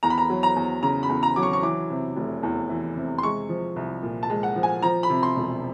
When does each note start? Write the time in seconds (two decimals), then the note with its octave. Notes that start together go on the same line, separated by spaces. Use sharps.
0.03 E2 A#5
0.10 B5
0.18 A#5
0.30 F#3
0.43 A#5
0.56 E2
0.83 C#3 A#5
1.03 B5
1.09 E2
1.23 A#5
1.36 F#3 D6
1.43 C#6
1.53 C#6
1.63 E3 D6
1.90 C3
2.16 F1
2.43 E2
2.69 E3
2.96 C3
3.18 C6
3.23 G#3 C#6
3.49 F3
3.76 C2
4.03 A#2
4.23 A5
4.30 G#3
4.43 F#5
4.56 F3
4.63 G#5
4.82 F3 A#5
5.03 B5
5.10 C3
5.23 C6
5.36 E1